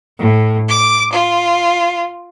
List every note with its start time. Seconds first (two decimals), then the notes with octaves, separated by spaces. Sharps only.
0.19 A2
0.68 D6
1.12 F4